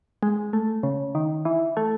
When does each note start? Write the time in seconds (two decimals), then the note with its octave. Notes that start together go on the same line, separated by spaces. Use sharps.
0.23 G#3
0.53 A3
0.83 C#3
1.15 D#3
1.45 E3
1.77 A3